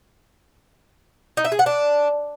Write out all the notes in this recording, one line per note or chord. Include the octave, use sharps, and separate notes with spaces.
D#4
E5
G#4
F#5
D4